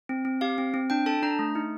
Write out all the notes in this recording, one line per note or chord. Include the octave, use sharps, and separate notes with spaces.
C4
C4
G4 F5
C4
C4
D4 G5
A4 A5
D4 A#5
A3
D#4